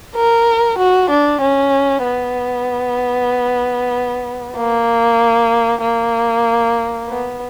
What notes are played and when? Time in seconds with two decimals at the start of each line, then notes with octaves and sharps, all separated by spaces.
0.15 A#4
0.78 F#4
1.10 D4
1.41 C#4
2.04 B3
4.57 A#3
5.82 A#3
7.09 B3